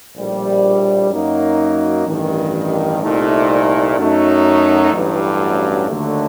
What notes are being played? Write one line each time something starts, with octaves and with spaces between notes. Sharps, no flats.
A#1 A2 G3
F#2 F#3 A#3 D#4
A1 G2 D#3
C2 A#2 A3 D#4
F#2 F#3 A3 D#4
A1 G2 F#3
D#2 D3 F#3 A3